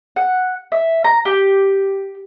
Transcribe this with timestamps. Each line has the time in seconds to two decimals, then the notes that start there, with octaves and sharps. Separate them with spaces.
0.16 F#5
0.72 E5
1.04 A#5
1.25 G4